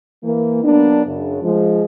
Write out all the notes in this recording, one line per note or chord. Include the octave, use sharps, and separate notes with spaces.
E3 A#3
F#3 A#3 B3 D4
F#2 C#3
F3 G#3